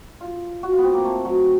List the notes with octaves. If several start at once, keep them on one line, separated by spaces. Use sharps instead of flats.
F4
F#4
F4
B3 C4
A#3
A3
F#3